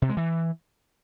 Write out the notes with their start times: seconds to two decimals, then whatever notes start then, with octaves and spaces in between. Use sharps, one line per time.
0.02 C3
0.09 G#3
0.17 E3